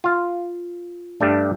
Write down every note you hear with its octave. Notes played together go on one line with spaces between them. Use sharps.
F4 F5
G2 G3 A3 D4